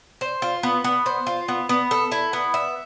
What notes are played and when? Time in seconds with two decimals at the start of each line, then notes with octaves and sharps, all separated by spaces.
0.21 C5
0.42 F4
0.63 B3
0.84 B3
1.06 C5
1.27 F4
1.48 B3
1.69 B3
1.91 A4
2.12 E4
2.33 B3
2.54 E5